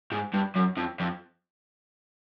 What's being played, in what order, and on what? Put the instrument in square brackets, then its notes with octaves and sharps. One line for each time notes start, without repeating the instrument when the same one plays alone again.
[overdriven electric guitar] G#2
G2
F#2
F2
F2